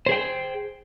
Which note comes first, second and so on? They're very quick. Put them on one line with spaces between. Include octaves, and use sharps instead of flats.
C5 G#4 G5